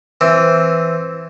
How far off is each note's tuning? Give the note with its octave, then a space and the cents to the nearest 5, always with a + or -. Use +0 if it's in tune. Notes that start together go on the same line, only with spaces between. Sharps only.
E3 +0 C4 +0